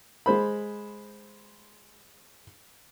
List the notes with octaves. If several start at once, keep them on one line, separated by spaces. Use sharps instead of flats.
G#3 C5 B5